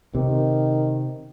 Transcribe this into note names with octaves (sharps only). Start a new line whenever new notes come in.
C3 D#3